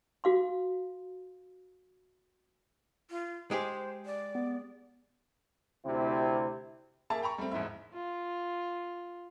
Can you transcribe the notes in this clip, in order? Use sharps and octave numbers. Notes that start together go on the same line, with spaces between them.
F#4 F5 C6
F4
G#3 G4 G#4 C5
D5
B3
D2 C3 C4 E4 G4
A#3 G#4 E5 A5
G5 A#5 B5 C#6
G3 A3 C4
E1 G#2 E4 E5
F4